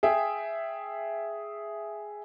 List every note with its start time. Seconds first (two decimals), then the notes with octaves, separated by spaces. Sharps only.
0.03 G#4 E5 G5